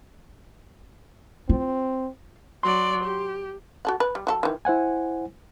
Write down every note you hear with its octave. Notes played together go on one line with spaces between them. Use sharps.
C4 F4
F#3 D5 C6
G4
F#4 A4 F#5
B4
G3
F#3 F#4 A4
D#3 E3
E4 C5 F#5 G#5